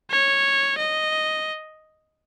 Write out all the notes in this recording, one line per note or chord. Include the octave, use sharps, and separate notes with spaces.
C#5
D#5